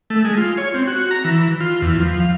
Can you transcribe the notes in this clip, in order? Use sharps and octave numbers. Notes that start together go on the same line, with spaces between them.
A3
G#3
F4
C#5
C4
F#4
A#5
E3
F4
E2
F3
F5